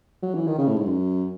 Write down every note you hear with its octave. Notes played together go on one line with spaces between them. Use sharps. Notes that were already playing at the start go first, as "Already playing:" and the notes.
F#3
E3
D#3
C#3
A2
G#2
F#2